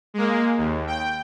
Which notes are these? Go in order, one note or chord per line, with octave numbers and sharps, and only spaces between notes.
G#3 A#3
D#2
G5